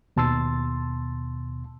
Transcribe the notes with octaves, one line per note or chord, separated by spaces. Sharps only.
D#2 B2 A5 C6 E6 A6